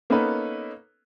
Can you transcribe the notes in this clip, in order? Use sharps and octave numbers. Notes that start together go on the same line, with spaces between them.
A#3 B3 C#4 D#4 A4 B4